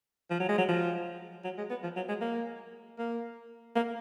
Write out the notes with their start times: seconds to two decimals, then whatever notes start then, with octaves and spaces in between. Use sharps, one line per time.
0.30 F3
0.39 F#3
0.48 G#3
0.58 F#3
0.68 F3
1.44 F#3
1.58 G#3
1.70 B3
1.83 F3
1.96 F#3
2.09 G#3
2.21 A#3
2.98 A#3
3.75 A#3